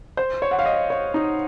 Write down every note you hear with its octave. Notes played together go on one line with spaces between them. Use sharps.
C5
C#5
F#5
F5
D#5
C#5
D#4